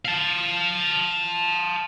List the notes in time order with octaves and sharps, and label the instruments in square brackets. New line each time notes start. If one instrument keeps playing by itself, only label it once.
[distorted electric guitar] F5 A5